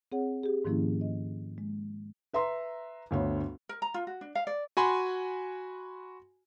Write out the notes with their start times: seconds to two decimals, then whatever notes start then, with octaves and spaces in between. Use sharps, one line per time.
0.12 C4 G#4 C#5 F#5
0.43 G4 G#4
0.65 G#2 D#3 F3 A#3 C#4 E4
1.01 D#5
1.58 G#3
2.33 B4 E5 A#5 C6
3.11 G1 D2 C#5
3.69 A#4
3.82 A#5
3.94 F4
4.07 F#4
4.21 D4
4.35 F5
4.47 D5
4.77 F#4 G#5 B5 C6